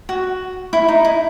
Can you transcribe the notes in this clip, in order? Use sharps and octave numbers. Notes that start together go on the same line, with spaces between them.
F#4
E4
D#4
E4